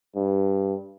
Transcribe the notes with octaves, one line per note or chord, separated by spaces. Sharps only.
G2